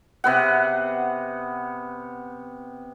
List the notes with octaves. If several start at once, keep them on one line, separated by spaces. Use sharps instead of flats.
C3 B3 F#5